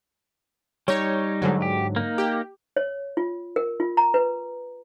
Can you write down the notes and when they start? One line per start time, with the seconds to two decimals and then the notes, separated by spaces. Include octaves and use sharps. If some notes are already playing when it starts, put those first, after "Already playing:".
0.88 G3 D#4 C#5
1.42 G#2 D3 F#3
1.62 G4
1.96 A#3 D#4
2.18 G4
2.77 C#5
3.17 F4
3.56 A#4
3.80 F4
3.97 A#5
4.14 B4